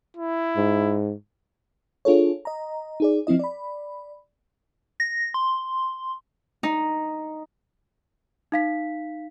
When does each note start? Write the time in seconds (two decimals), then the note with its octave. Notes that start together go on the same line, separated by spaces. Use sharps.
0.17 E4
0.57 G#2
2.05 D4 F4 G#4 A4 C#5
2.45 D#5 A#5
3.00 D#4 G#4 D5
3.27 F3 C4 E4 D#5
3.39 D5 B5
5.00 A#6
5.34 C6
6.63 D#4
8.52 D#4 F5 B6